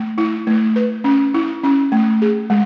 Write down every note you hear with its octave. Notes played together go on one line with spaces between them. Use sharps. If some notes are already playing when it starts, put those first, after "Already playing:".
Already playing: A3
E4
A3
B4
C#4
E4
C#4
A3
G#4
G#3